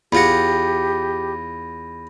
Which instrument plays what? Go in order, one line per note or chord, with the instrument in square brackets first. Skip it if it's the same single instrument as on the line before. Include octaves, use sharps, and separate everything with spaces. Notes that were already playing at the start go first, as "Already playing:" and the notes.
[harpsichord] E2 F4 F#5 [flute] G4 [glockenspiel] B5 A#6